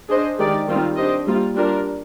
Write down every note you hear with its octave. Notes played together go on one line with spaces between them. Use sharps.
D4 G#4 C5 D#5
D#3 G#3 D#4 G4 D5
D#3 G3 C4 F4
D4 G4 C5 D#5
G3 A#3 F4
G3 D4 F4 A#4